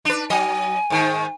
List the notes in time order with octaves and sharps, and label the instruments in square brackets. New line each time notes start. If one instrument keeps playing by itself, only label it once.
[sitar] D4 B4
[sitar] F#3 D#5 [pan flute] G#5
[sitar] G#2 D#3